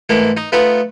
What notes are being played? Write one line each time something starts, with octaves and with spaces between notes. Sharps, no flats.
G#2 E3 A3 A#3
D#4
A3 B3 D#4 F4 B4